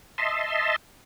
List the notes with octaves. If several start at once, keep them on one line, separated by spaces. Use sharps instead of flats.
D#5 E5 A5 C6